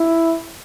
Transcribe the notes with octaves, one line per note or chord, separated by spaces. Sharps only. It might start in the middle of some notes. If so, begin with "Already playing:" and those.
Already playing: E4